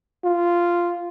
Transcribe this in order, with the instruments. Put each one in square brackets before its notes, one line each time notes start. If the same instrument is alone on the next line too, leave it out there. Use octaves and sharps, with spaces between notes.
[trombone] F4